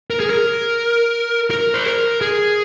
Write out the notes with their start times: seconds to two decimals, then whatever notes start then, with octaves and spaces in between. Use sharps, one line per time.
0.10 A#4
0.20 G#4
0.30 A#4
1.51 A#4
1.74 C5
1.86 A#4
2.21 G#4